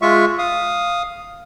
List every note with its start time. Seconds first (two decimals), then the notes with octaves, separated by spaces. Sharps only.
0.02 G#3 F4 E5 C#6
0.39 F5 D#6